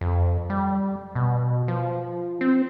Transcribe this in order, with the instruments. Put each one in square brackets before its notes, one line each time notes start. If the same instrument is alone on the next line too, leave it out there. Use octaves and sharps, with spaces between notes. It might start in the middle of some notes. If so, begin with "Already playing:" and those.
[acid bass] F2
G3
B2
F3
C4